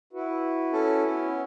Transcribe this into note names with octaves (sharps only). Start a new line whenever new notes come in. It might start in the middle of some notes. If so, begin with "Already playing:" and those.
E4 F#4 B4
C#4 A4
B3 C#4